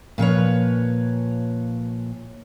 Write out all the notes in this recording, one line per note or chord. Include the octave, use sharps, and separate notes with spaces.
A#2 F3 B4 C#5